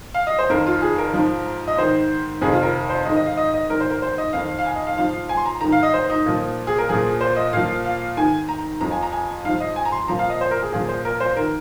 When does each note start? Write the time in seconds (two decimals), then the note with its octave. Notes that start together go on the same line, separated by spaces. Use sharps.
0.14 F5
0.27 D#5
0.39 C5
0.50 F2 D#3 A#4
0.67 F4
0.82 G#4
0.98 A#4
1.13 G#2 F3
1.68 D#5
1.77 G#2 D#3 C5
2.41 F2 C3 D#3 G#4
2.53 F4
2.63 A#4
2.89 C5
3.05 G#2 D#3 D#5
3.16 D#5
3.26 F5
3.37 D#5
3.54 D#5
3.70 G#2 D#3 A#4
3.81 C5
3.90 A#4
4.02 C5
4.18 D#5
4.33 F2 D#3 F5
4.59 F5
4.65 G#5
4.76 D#5
4.87 F5
4.97 G#2 F3 F5
5.29 G#5
5.37 C6
5.46 A#5
5.61 G#2 D#3 A#5
5.72 F5
5.83 D#5
5.94 C5
6.10 D#4
6.26 A#2 F3
6.67 G#4
6.78 A#4
6.89 A#2 F3 G#4
7.21 C5
7.37 D#5
7.53 A#2 F3 F5
7.85 F5
8.17 G#2 D#3 G#5
8.49 A#5
8.81 F2 F3 A#5
8.91 G#5
9.03 A#5
9.12 G#5
9.44 G#2 F3 F5
9.60 D#5
9.76 G#5
9.85 A#5
9.92 C6
10.08 A#2 F3 A#5
10.19 F5
10.30 D#5
10.41 C5
10.51 A#4
10.62 G#4
10.72 A#2 F3 G#4
10.88 C5
11.05 A#4
11.20 C5
11.36 D#3 A#4